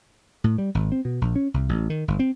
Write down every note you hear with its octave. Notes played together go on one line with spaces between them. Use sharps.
A2
G3
G#1
C4
B2
A#1
C#4
C2
A1
D#3
G1
C4